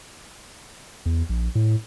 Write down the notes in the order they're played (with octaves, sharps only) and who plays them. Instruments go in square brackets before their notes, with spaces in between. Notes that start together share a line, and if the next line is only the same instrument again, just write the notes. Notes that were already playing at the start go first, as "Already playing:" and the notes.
[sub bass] E2
A#1
A2